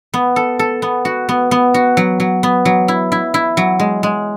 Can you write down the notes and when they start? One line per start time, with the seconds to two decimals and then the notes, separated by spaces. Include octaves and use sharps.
0.14 B3
0.36 A4
0.59 A4
0.82 B3
1.05 F#4
1.29 B3
1.51 B3
1.74 F#4
1.97 F#3
2.20 F#3
2.43 B3
2.65 F#3
2.88 E4
3.12 E4
3.34 E4
3.57 F#3
3.80 G#3
4.03 G#3